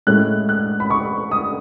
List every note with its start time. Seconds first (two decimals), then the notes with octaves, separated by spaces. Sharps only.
0.07 A2 G#3 C#4 E4 F#6
0.49 F#6
0.80 B5
0.90 C#6
1.31 D#6